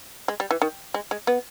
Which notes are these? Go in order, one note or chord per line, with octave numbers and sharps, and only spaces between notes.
G#3
G3
E3
D#3
G#3
G#3
B3